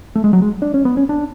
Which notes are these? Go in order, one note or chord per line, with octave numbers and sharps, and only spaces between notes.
A3
G#3
F#3
G#3
D4
C#4
B3
C#4
D4